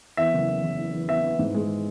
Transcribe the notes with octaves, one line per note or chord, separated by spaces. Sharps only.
E2 E5
F#1
E3
F#1
E3
E3
E2 E5
E3
G#2
G#3